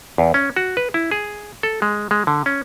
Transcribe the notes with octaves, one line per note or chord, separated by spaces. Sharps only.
E2
C#4
F#4
B4
E4
G#4
A4
G#3
G#3
D3
C#4